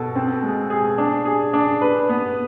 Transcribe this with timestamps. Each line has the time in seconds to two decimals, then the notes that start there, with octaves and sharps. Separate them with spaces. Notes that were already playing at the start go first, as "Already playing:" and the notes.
Already playing: B2 A4
0.15 C4
0.43 G#3
0.70 G#4
0.98 D4
1.25 G#4
1.53 D4
1.82 B4
2.09 B3